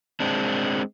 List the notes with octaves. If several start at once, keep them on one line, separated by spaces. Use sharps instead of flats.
G#3 C4 D4